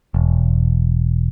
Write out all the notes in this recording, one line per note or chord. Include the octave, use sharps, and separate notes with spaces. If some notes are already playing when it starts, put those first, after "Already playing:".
E1